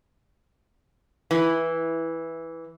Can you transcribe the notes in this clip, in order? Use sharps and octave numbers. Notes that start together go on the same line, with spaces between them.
E3